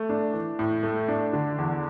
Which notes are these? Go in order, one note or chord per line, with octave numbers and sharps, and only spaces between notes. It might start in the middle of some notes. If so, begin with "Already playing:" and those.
Already playing: A3
D4
E3
A2
A3
D4
D3
E2